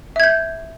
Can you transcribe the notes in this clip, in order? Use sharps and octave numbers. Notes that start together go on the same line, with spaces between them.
E5 G6 G#6